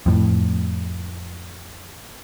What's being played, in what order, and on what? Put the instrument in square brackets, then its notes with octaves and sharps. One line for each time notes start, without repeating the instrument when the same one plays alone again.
[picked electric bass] F2 A2